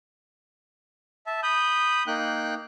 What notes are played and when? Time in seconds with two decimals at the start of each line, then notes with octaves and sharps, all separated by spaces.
1.27 E5 A5
1.43 B5 D#6 G6
2.07 A#3 D#4 G5 F#6